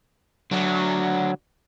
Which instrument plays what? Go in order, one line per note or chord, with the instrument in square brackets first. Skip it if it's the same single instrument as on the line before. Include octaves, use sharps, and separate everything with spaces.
[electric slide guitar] D3 D4 F#4 [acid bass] F#3